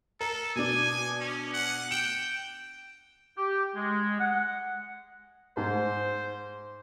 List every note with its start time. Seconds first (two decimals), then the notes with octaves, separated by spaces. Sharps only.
0.21 A4 A#4
0.56 B2 D4 G#5
1.20 C#4
1.53 F#5
1.91 G5 E7
3.37 G4
3.76 G#3
4.20 F#5
5.57 G#2 C5